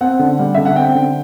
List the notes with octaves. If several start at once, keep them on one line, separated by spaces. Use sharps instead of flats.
C4 F#5
D3
G3
D3 E5
F#5
C4 G5
D3